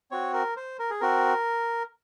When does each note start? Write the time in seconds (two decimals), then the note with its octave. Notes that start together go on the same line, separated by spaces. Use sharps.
0.11 C4 F#4 C#5
0.34 A#4
0.57 C5
0.79 A#4
0.90 G#4
1.01 C4 F#4 A#4